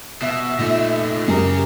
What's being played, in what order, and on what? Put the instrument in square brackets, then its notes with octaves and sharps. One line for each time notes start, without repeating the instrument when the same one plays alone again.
[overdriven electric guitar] B2 [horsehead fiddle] E5
[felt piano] A#2 [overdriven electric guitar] A3 D#4
[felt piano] F#2 [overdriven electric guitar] C#3 G#4 [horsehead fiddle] G4 A#4